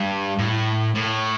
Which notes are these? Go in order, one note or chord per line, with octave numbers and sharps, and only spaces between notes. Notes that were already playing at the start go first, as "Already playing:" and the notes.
Already playing: G2
A2
A2